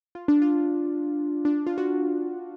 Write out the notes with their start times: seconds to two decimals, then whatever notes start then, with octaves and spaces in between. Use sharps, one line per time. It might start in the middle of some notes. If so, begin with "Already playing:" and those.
0.15 F4
0.28 D4
0.42 F4
1.45 D4
1.67 F4
1.78 F#4